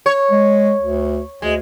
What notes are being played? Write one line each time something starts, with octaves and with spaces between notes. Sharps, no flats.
C#5
G#3
D2
D2 G#3